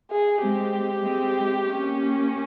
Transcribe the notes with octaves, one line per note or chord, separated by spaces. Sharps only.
G#4
G#3 C4 G4
G#3 C4
A#3 C#4